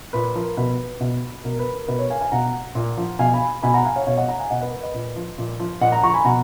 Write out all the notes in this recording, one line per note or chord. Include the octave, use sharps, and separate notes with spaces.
A#2 B4
F3 A#4
B2 B4
B2
B2 A#4
B4
A#4
B2 B4
A#4 C#5
F5 G#5
F5 G#5
B2 F#5 A#5
A#2
F3
B2 F5 G#5
G#5 B5
B2 G#5 B5
F#5 A#5
F5 G#5
C#5 F5
B2 C#5 F5
D#5 F#5
F#5 A#5
F5 G#5
B2 D#5 F#5
B4 D#5
B4
B4 D#5
A#2
F3
A#2
F3
A#2 D#5 F#5
F#5 A#5
F3 A#5 C#6
G#5 B5
B2 F#5 A#5